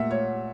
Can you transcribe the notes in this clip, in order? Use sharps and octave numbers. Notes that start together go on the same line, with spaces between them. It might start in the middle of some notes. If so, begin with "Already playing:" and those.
Already playing: A#2 A#3 E5 F#5
C#5